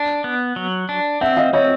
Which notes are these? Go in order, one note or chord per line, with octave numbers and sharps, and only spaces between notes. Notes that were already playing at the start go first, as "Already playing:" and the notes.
Already playing: D4
B3
F#3
D4
C4 E5 F#5
D#5 F5
C4 C#5 D#5